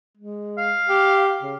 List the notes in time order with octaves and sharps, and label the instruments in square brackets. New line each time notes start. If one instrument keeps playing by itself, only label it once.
[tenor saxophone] G#3
[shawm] F5
[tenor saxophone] G4
C#3